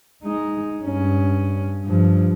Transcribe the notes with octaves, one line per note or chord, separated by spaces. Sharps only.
G#3 D#4
G2 C#4
G2 F3